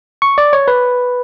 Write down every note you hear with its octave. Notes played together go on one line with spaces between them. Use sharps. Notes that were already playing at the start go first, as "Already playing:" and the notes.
C#6
D5
C#5
B4